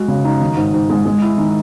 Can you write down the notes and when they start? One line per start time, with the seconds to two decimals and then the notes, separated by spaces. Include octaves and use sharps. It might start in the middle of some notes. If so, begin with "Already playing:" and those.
Already playing: G#3 F#4
0.08 C#3
0.24 D#4
0.41 D#3
0.57 G#2
0.74 G#2
0.90 G#3
1.05 G#3
1.22 E4
1.38 D#3